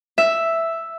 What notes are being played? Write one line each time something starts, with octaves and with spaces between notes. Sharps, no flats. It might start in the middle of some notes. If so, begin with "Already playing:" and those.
E5